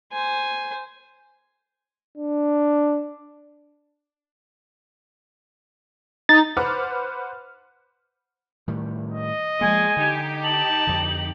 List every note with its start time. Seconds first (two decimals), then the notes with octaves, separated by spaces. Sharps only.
0.12 C5 G#5
2.17 D4
6.29 D#4 A6
6.57 B4 C5 F#5 B5 D6 F6
8.68 A2 D#3 G3
9.12 D#5
9.61 F3 F#3 G#3 A#3 G#5
9.97 D3 D#4 G4
10.44 A5 F#7
10.87 F2 D3